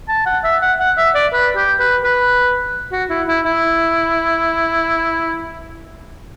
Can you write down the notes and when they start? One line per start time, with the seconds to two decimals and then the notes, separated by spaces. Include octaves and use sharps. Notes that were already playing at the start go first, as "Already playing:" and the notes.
0.08 A5
0.26 F#5
0.44 E5
0.61 F#5
0.79 F#5
0.97 E5
1.15 D5
1.33 B4
1.56 G4
1.79 B4
2.03 B4
2.92 F#4
3.10 E4
3.27 E4
3.45 E4